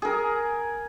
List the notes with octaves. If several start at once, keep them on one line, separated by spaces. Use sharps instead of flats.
G#4 A#4